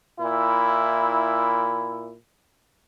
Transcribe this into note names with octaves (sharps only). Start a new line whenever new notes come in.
A#2 E4